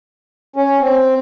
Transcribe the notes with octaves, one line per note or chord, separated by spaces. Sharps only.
C#4
C4